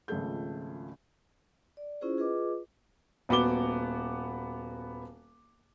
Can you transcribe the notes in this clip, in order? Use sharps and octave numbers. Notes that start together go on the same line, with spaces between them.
G#1 C#2 F3 A3 G#4 G6
D5
C#4 E4 F4 G#4 C5
F4 G#4 B4 D#5 D6
D#1 B3 F#4 D6 G7